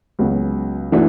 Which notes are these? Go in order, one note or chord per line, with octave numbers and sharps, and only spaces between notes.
C#2 C#3 F#3 B3 F#4
E3 A3 D4 F#4